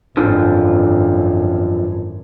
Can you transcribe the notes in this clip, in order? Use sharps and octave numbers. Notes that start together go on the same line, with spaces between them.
G#1 F#2 D3 F3